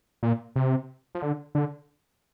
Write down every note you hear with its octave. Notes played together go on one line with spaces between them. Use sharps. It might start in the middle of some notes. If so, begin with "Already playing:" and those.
A#2
C3
F3
D3
D3